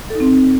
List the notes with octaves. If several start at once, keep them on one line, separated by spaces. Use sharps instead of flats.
A4
D#4
C4